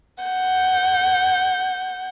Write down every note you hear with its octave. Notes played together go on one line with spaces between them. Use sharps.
F#5 G6